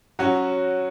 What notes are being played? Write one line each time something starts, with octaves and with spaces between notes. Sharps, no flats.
F#3 C#4 F#4